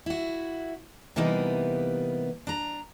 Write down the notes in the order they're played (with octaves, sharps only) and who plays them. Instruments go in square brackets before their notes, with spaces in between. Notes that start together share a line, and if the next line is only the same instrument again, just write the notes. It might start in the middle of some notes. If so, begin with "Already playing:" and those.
[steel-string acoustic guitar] E4 F#4
C3 E3 G3 A#3 B3 D#4
D4 A#5